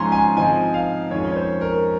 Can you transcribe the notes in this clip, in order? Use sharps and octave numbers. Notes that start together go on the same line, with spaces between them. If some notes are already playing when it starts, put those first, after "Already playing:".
Already playing: G#2 F3 G#3 C#4 G#5 A#5 C6
G#5
G#2 F3 C4 D#4 G#5
F5
F2 D#3 G#3 C#4 C#5
C#5
C5
A#4